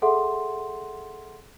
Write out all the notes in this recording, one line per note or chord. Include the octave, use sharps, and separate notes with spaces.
G#4 A4 E5 F#5 C6